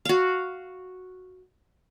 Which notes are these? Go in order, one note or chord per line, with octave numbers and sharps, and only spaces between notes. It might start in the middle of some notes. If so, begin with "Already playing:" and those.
F#4 F5